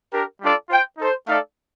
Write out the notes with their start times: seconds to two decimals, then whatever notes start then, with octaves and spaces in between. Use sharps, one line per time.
0.12 D4 G4 A#4
0.41 G3 D4 F4 A4 D5
0.70 F4 C5 G5
0.98 D#4 A4 C5
1.27 A3 D#4 A4 D5 F5